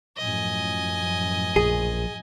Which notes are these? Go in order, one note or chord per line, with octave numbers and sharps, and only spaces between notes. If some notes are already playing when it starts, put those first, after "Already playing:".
F#2 A2 F3 D#5 G#5
A#1 G#4